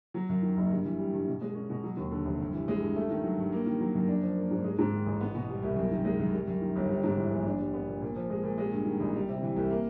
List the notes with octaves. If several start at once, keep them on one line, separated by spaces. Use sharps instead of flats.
F#3
F#2
D#3
F#1
G2
E3
G3
G2
B2
G#3
C#4
B2
F#3
D#2
D3
F1
G2
E3
G#3
G2
A3
D#3
F#3
G2
A#3
D#3
F#3
F#2
D4
F3
A#3
G#2
G#3
G#2
D#3
A1
B3
B2
G3
C2
F#2
D#3
G#3
F#2
G3
F#2
D#3
G1
G3
G#2
E3
A#1
D4
G3
B3
A#2
A#2
F3
G#3
A#2
G#3
G2
D#3
A1
G3
C3
E3
C2
A#3